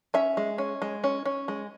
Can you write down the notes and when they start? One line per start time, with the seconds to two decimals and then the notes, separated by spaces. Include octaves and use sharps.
0.14 C#4 E5
0.37 G#3
0.58 C#4
0.82 G#3
1.04 C#4
1.25 C#4
1.48 G#3